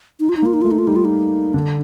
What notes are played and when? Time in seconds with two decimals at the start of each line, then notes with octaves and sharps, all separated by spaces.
0.20 D#4
0.29 F4
0.37 D#4
0.42 A#3 F4
0.54 D#4
0.62 A3 F4
0.71 D#4
0.79 F4
0.87 G3 D#4
0.96 F4
1.05 D#4
1.53 D3 D4